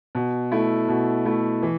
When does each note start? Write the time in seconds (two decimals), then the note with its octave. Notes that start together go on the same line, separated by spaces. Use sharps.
0.15 B2
0.52 A3 E4
0.89 B2
1.25 A3 E4
1.63 E3